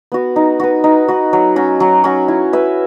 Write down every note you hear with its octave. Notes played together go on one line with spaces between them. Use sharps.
B3 F#4
D#4
F#4 B4
D#4
F#4 B4
F#3
C#4 F#4
F#3
C#4 F#4
E4
B4 E5